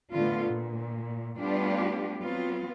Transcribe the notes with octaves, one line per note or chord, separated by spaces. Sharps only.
A2 D3 A3 B3 F4
A#2
G3 A3 B3 D4 F4 G4
F#3 B3 C4 F4